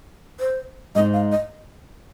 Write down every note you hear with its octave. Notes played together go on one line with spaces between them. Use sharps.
C5
G#2 G#3 D#4 C5 D#5
F5
D#5